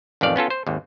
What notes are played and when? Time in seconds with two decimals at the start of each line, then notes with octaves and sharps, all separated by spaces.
0.21 A1 F2 D#3 D5 F5
0.36 B3 C#4 F4 A4
0.50 C5
0.67 G#1 D#2